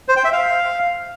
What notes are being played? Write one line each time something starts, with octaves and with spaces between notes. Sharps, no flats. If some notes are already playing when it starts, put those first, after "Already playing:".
C5
G5
E5
F5